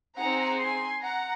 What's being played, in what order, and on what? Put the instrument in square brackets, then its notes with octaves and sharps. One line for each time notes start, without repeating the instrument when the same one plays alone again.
[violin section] C4 D#4 G#4 F#5 A#5
G#5 C6
F#5 A#5